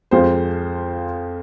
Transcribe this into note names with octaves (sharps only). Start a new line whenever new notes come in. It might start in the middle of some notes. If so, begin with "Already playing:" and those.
F2 F3 G#3 F4 C5